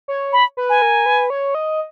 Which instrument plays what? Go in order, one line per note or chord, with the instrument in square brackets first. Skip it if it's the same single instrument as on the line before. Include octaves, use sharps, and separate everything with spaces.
[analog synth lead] C#5
[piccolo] B5
[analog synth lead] B4
[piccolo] G#5
[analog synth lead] A#4
B4
C#5
D#5